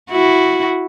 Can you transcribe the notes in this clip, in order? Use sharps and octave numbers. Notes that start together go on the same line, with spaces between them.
E4 F#4